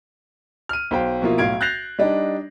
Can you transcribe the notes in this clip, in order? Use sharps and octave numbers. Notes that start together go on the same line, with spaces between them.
F6 D#7
B1 C5 F5 G5
B2 F3 A#3 E4 F4
B1 A2 F5 G#6 D7
F#6 G6 A6 A#6 C7 F7
G3 D4 D#4 D#5